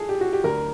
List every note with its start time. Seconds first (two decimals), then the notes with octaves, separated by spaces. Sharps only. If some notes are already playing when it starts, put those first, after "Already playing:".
Already playing: G#4 A4
0.09 G4
0.21 F#4
0.33 G4
0.44 D2 D3 F#3 A#4